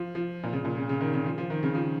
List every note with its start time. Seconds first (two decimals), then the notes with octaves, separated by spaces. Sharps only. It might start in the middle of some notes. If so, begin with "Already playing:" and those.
Already playing: F3
0.15 F3
0.43 A#2
0.53 C#3
0.65 A#2
0.77 C#3
0.89 C#3
1.00 D#3
1.13 C#3
1.26 F3
1.38 F3
1.50 D#3
1.63 C#3
1.75 F3